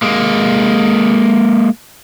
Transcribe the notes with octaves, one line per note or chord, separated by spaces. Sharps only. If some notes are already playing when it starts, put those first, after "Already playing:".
G#3 A#3